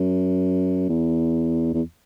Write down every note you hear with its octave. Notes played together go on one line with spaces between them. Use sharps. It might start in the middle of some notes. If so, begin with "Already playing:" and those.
Already playing: F#2
E2
E2